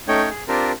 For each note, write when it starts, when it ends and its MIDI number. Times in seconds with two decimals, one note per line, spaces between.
0.08 0.29 57
0.08 0.29 61
0.08 0.29 63
0.08 0.29 73
0.08 0.29 79
0.30 0.43 68
0.48 0.72 60
0.48 0.72 62
0.48 0.72 65
0.48 0.72 67
0.48 0.72 70
0.48 0.72 72